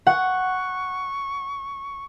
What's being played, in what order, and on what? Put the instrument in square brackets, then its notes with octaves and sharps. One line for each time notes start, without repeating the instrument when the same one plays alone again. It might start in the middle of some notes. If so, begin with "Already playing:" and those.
[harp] F#5 [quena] C#6